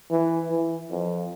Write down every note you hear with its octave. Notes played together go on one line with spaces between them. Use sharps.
E3
E3
F2